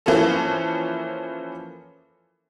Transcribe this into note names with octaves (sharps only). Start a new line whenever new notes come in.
E3 F3 A#3 C#4 A4